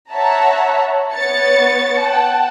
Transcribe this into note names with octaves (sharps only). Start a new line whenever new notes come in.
C#5 E5 F#5 A5 A#5
B3 C#5 A6 C#7
F#5 G5 A5